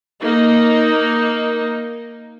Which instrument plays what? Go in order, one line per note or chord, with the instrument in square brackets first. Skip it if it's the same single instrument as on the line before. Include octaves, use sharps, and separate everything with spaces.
[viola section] A#3 D#4